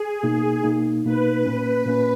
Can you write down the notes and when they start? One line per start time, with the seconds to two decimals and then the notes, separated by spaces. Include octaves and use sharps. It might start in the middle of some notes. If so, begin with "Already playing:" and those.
Already playing: G#4
0.23 B2 A#3 D#4
0.63 B2 A#3 D#4
1.04 B2 A#3 D#4 B4
1.45 A#2 A#3 C#4 B4
1.86 A#2 A#3 C#4